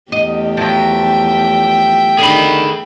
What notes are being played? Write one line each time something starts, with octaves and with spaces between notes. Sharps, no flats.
E2 A3 G4 D#5
F3 F#3 E5 G5
D3 D#3 G#4 B5